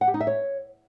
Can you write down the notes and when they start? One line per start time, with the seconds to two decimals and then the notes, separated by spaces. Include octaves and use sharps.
0.01 F#5
0.08 G4
0.14 D#4
0.20 E5
0.27 C#5